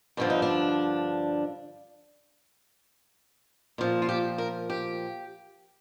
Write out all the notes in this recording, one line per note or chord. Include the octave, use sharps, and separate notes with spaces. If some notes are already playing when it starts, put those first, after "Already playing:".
G2 D3 F3 D4
D#4
D4
A#2 F3
F4
G4
A#4
G4